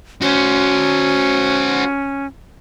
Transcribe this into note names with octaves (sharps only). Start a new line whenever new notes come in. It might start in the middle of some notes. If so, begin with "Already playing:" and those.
C#4 F#4 C5